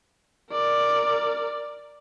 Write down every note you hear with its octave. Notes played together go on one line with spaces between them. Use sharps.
A#4 D5